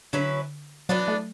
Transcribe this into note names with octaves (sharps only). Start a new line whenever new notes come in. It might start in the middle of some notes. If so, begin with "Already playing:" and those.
D3 F#3 C#4 E4 B4
E3 F#3 B3 D4
A3